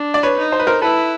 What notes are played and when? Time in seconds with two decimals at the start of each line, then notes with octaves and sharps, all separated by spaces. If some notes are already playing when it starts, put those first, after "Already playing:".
Already playing: D4
0.14 D5
0.23 B4 C#5
0.38 D#4
0.52 C5
0.59 B4
0.67 A#4 C5
0.82 E4 A4 B4